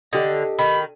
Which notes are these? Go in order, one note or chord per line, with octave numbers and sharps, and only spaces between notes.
D3 G4 D#5
D#3 B5